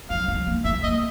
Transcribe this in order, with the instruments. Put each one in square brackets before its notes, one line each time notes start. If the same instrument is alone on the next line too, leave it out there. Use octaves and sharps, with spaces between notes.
[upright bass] F#3 [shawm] F5
[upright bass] F3
A#3
[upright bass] A3 [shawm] E5
[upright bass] A#3 [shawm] D#5